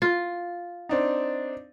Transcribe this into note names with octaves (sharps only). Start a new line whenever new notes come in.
F4
C4 D4 D#4